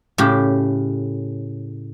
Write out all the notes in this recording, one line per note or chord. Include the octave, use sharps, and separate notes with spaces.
A2 C#3 G4